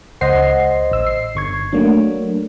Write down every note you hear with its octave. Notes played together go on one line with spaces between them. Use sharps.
C#2 C5 D#5 F#5 C6 C7
A1 E6
C7
G1 C#6 G#6
F#3 A3 A#3 D4